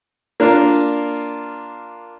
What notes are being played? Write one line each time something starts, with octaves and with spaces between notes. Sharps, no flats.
A#3 D4 F4